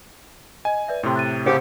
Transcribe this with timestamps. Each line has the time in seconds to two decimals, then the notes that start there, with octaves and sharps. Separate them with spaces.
0.65 D#5 G#5
0.88 B4 D5 E5
1.03 A2 C3 G5 C6
1.16 F#6 A6 D#7
1.46 C#3 C4 G4 F#5 C#7 D7